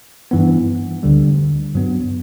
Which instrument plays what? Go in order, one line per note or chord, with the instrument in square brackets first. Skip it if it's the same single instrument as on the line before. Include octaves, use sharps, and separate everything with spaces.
[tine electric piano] G2 E3 B3
D2 D3 G3
G2 F#3 B3